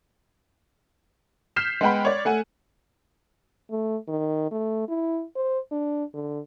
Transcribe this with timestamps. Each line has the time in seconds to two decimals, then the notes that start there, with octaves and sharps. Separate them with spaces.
1.56 F6 G6 B6 C7 E7
1.81 G#3 B3 F#5 G5 B5
2.05 C#5 D5
2.25 A3 F#5 G#5
3.70 A3
4.08 D#3
4.51 A3
4.88 E4
5.36 C5
5.71 D4
6.14 D3